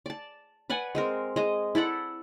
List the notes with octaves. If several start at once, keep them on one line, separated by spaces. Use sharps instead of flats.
D5 A5
B4 D5 F#5 G#5
G#3 C4 A#4
G#3 D#5
E4 A4 D5 F#5